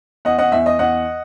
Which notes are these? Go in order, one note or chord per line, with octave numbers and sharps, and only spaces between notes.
E2 D#5 F#5
D#5 F#5
E2 E5
D#5
E2 D#5 F#5